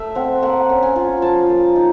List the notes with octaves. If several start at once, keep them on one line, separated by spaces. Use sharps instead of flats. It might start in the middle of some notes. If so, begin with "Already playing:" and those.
Already playing: A3 E5
C4 F#5
A#3 F#5
C#4
G#5
F4
F3 A5
A#3
D#4